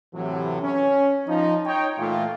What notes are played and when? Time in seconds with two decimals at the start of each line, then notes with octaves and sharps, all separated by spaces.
0.14 A2 C3 E3 F#3
0.61 C#4
1.28 F3 D#4
1.65 D#4 C#5 G5
1.97 A#2 E3 A3 F4